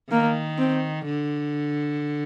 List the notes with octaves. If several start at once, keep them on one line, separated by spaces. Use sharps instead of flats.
D#3 A#3
C4
D3